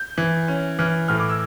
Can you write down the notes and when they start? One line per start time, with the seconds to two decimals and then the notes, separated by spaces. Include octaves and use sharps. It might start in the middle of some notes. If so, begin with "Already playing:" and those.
Already playing: G6
0.18 E3
0.48 C#4
0.79 E3 F6
1.08 A2 F6
1.20 D6
1.30 E6